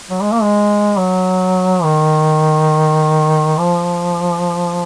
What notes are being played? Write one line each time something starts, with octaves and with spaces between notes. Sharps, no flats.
F#3
G#3
A#3
G#3
F#3
D#3
F3